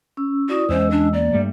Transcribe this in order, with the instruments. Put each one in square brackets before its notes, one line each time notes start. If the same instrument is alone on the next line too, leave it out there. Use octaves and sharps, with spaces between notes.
[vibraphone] C#4 E6
[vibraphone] E4 D5 D#6 [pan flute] F#4
[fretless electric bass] E2 C4 C#4 [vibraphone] G#3 D#5 E6 [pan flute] C5
[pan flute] D4
[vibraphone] A#3 [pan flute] D5
[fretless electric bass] G2 G3 A3